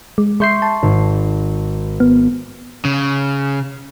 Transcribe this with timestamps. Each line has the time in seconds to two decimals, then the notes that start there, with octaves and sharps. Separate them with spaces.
0.18 G#3
0.40 G#3 E5 C6 C#6 G6 C7
0.62 A5
0.83 G#1
2.00 B3
2.85 C#3